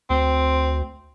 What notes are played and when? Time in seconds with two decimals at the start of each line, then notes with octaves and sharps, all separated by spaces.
0.10 D2 C4